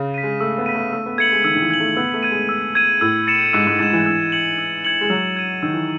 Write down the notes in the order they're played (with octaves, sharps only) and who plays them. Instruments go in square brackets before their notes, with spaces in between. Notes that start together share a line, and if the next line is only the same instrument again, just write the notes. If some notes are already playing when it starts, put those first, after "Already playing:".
Already playing: [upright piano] C#3
[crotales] B6 D#7
[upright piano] G#3
[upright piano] A3 [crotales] E6
[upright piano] B3
[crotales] B6 D#7
[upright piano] A3
[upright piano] A3 [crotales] E6
[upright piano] B3
[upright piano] A3 [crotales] G#6 C#7 F#7
[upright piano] G#3
[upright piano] D#3 [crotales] E6
[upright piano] D#3
E3
[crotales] G#6 C#7 F#7
[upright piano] A3
[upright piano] B3 [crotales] E6
[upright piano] A3
[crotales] G#6 D#7
[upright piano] G#3
[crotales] E6
G#6 D#7
[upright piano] A2 [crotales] E6
[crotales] A6 C#7 E7
[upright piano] G#2 [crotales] E6
[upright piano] G#2
[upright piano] G#2 [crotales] A6 C#7 E7
[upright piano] E3
[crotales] E6
G#6 C#7 F#7
E6
G#6 C#7 F#7
[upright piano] G#3
[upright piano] F#3 [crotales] E6
[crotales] G#6 D#7
[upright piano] D#3 [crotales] E6
[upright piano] E3